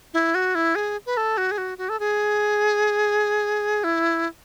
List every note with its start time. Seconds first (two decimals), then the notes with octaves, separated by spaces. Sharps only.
0.14 E4
0.35 F#4
0.55 E4
0.75 G#4
1.06 B4
1.17 A4
1.37 F#4
1.51 G#4
1.58 F#4
1.78 F#4
1.89 A4
2.00 G#4
3.84 E4